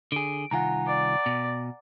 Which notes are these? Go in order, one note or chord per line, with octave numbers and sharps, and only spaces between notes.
D3 G#4 D7
C2 D#3 F4 F#5 G#5 A#5
D5
B2